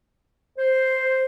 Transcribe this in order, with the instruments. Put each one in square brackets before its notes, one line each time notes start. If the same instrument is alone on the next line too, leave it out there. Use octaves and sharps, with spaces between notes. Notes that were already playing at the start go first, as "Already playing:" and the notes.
[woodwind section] C5